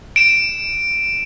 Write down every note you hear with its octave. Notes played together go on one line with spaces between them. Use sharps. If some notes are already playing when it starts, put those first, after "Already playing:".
D7 E7